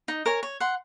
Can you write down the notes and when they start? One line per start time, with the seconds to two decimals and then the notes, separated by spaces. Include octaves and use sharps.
0.08 D#4
0.26 A#4 C#5 G#5
0.43 C#5
0.60 F#5 C6